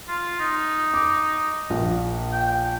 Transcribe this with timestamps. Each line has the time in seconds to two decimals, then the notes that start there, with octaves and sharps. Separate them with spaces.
0.08 F4
0.40 D#4
0.94 D6
1.70 A#1
2.33 G5